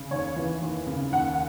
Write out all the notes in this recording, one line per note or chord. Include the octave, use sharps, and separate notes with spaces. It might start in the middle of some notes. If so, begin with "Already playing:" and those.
Already playing: C#3
D#2 C#5
E3
D#2
C#3
D#2 F#5
F#5